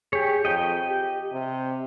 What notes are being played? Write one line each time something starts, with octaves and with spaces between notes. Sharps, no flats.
G4 G#4 C#5
F2 D#5 G5
G4
C3